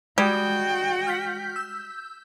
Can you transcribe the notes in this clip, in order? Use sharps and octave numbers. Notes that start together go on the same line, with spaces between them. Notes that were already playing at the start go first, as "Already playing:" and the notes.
G3 G#3 F#4 G5
F6 G6 B6
E6 G6